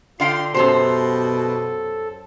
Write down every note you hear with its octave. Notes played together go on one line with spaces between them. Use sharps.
D3 F4 F5 G5 C6
F#2 B2 G4 A4 C5